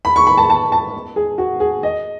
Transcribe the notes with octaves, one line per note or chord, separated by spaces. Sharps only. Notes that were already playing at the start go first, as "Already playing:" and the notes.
B5
C#6
B5
A5
A5
A5
G#4
F#4
G#4
D#5